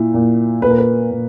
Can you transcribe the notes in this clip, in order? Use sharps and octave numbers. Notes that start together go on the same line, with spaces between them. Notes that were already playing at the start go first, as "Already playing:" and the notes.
Already playing: A#2 E4
A#2
A#2 B4
A#4
B4
A#2